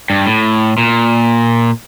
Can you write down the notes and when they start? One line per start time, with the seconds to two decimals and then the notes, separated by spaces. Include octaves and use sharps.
0.10 G2
0.27 A2
0.78 A#2